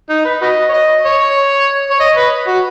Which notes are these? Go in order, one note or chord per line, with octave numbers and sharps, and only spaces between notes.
D#4
B4
F#4 B4 D#5
C#5
D#5
C#5
C#5
D#5
B4
F#4